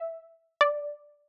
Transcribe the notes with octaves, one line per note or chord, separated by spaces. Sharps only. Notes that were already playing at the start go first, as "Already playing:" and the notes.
Already playing: E5
D5